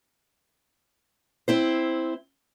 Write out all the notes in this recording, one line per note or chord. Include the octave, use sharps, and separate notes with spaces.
C4 E4 C5